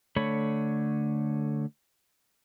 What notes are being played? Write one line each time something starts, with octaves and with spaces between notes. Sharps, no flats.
D3 A3 C#5 B5